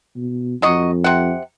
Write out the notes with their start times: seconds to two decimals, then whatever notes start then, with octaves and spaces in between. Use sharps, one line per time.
0.16 B2
0.62 F2 F#3 D#5 C#6
1.04 C3 F#5